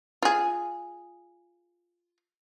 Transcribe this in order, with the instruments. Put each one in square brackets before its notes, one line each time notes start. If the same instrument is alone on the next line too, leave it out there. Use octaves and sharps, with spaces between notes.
[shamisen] F4 G#4